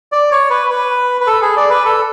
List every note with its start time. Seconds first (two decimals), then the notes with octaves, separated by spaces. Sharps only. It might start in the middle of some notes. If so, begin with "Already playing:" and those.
0.12 D5
0.31 C#5
0.50 B4
0.70 B4
1.21 B4
1.27 A4
1.42 G#4
1.57 D5
1.70 B4
1.85 A4